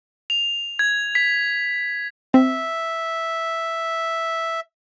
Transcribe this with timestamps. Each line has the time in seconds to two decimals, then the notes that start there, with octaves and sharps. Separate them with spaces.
0.30 F7
0.79 G#6
1.15 B6
2.34 C4 E5